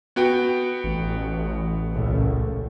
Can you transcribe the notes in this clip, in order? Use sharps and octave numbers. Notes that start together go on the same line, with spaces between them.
B3 F#4 G5
A1
C#2 A#2 A3